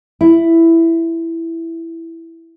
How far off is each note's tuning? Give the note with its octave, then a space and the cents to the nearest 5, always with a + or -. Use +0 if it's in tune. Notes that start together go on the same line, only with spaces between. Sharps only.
E4 +5